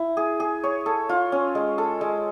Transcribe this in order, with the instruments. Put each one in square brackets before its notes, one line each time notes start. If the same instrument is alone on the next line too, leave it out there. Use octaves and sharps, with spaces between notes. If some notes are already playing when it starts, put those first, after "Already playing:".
Already playing: [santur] E4
G#4
G#4
C#5
A4
F4
C#4
G#3
A4
G#3